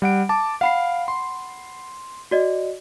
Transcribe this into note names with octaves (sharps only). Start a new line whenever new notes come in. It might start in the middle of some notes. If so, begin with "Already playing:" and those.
G3 F#5 D7
A5 D6
F5 F#5 B5 C7
C6
F#4 D5 D#5